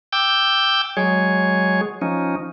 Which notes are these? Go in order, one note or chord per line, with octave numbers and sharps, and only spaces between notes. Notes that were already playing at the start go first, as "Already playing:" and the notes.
G5 D6 E6 G6
F#3 G#3 G#4 C#5
F3 C#4 D#4